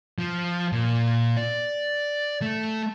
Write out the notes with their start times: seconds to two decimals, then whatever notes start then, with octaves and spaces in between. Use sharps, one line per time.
0.19 F3
0.72 A#2
1.37 D5
2.42 A3